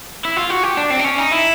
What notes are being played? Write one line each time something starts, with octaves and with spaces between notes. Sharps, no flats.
E4
F4
F#4
G4
D4
C4
D4
C#4
D#4
E4